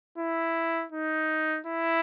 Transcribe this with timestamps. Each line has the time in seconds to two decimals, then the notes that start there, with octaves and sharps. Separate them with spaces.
0.18 E4
0.92 D#4
1.66 E4